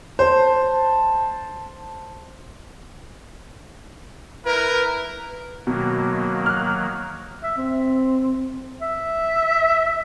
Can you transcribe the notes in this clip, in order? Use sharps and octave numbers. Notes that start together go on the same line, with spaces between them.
C5 A5
E4 A#4 B4
B2 D#3 F#3 A#3
F6 F#6
E5
C4
E5